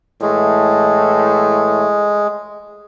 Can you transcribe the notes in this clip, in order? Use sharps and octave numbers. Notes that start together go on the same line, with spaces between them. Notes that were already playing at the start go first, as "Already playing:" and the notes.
A2 E3 G#3 A3